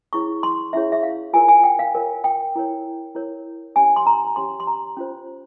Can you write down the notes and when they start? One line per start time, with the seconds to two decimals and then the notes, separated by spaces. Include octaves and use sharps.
0.13 C#4 E4 G#4 C#5 C#6
0.43 C6
0.73 C#4 E4 G#4 C#5 E5
0.92 E5
1.03 F5
1.33 F4 A#4 C#5 G#5
1.48 G#5
1.64 G5
1.79 F5
1.95 F4 A#4 C#5
2.24 G5
2.56 E4 A#4 C#5
3.15 E4 A#4 C#5
3.76 C#4 G4 C#5 G#5
3.96 C6
4.06 A#5
4.36 C#4 G4 C#5 C6
4.60 C6
4.67 A#5
4.97 C#4 F4 C5